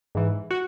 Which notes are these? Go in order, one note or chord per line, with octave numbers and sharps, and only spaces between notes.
G#2 E3
F#4